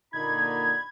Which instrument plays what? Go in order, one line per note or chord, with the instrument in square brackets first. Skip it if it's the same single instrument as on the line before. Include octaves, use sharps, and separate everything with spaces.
[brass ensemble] A#2 D3 D#4 [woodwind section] B5 [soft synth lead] G#6